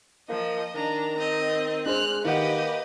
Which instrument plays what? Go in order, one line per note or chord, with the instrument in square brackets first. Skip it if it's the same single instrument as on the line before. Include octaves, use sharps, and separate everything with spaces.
[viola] F3 [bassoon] A#3 [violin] D#5
[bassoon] D#3 [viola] D4 A#5
[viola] C4 [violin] D#5
[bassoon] G#3 [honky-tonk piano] D4 C5 [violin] F6 F#6
[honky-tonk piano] D#3 F#5 [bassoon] A#3 [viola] G4 [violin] B4 D#5